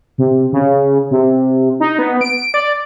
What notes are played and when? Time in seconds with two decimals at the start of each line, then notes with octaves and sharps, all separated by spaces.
0.18 C3
0.52 C#3
1.11 C3
1.80 D#4
1.99 B3
2.21 D7
2.54 D5